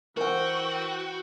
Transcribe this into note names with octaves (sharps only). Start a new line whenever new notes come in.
E3 F#4 A#4 C5 F#5 G5